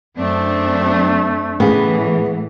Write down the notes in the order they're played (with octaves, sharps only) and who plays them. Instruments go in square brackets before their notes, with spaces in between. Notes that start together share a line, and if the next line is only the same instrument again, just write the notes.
[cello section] F#2 C4 D4 [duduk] A3
[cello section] A2 E3 [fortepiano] C#3 G#4 [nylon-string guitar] B3 F#5